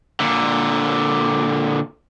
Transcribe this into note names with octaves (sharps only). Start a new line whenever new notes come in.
A#2 D3